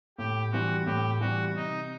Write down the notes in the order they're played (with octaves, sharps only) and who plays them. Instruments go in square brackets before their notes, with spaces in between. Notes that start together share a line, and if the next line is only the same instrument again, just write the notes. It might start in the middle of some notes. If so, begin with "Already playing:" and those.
[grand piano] A2 [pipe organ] G4
[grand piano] E3 G3 C4 [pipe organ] F#4
[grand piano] A2 [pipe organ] G4
[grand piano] E3 G3 C4 [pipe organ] F#4
[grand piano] C3 [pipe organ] D#4